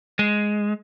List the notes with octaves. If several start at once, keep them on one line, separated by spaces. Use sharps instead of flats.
G#3